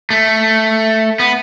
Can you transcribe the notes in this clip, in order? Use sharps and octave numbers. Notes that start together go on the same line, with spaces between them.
A3
B3